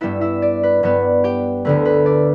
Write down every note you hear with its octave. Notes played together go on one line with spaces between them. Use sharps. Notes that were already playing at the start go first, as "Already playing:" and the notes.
G2 G3 B3 E4 E5
E4 E5
D5
B4
G2 G3 B3 B4
G4 G5
D2 D3 A3 B4
B4
D5